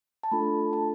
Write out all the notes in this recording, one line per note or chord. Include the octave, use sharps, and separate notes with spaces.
A5
A3 D4 F4 A4 B5
A5